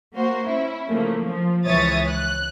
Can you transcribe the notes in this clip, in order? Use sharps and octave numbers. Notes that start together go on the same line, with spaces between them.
A#3 F#4 C5
C#4 E4
C#3 F3 A3 A#3
F3
C#2 E3 C#5 E5 D#6 A6
F#6